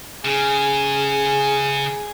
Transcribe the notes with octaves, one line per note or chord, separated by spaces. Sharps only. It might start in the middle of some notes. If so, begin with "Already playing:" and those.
C#3 G#4